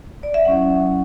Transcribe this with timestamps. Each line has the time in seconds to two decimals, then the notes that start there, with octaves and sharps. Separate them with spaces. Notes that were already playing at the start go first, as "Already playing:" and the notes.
0.23 D5
0.34 E5
0.45 F#3 C#4 E4 F#5